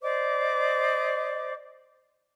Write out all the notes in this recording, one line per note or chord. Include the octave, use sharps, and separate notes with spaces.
C5 D5 D#5 D6